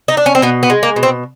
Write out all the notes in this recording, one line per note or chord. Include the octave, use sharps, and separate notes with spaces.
D#4
D4
C#4
C4
B2 B3
B3
G#3
A#3
B2
C4